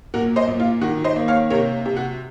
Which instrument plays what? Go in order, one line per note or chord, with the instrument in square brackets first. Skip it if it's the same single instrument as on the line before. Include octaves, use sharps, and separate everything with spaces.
[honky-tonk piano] A#2 F#4 A#4
C5 D#5
A#2
F4
D#3 F#4
C5 D#5
A#3
C#5 F5
C3 A#4 C#5
C3
F#4